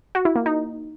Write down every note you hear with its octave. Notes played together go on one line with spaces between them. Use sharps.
F#4
E4
A#3
D#4